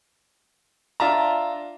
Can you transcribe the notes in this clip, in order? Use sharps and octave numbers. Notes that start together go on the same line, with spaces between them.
D4 F4 E5 A5 A#5